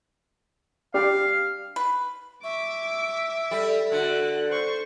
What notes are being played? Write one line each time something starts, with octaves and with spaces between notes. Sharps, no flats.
D4 G4 D5 F5
B4
E5 C#6 D6
G3 A4
D3 F#4 F#6
C5 C#6